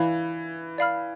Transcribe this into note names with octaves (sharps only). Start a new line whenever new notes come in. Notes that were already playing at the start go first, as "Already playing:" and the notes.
Already playing: E3 D5 F5 B5
D5 F5 B5 F6